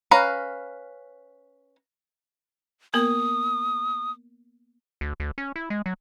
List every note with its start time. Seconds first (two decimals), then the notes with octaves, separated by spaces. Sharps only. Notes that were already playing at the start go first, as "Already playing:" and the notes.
0.11 C#4 B4 F5 A#5
2.94 A#3 B3 A#4 D#6
5.01 D2
5.20 D2
5.38 C#4
5.56 E4
5.70 G#3
5.86 F#3